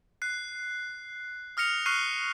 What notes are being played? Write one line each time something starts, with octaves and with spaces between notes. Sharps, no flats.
F#6 C7
D#6 F6 A#6 C#7 F7
C#6 F6 F#6 C7 D#7 G7